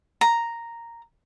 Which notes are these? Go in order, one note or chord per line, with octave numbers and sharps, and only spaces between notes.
A#5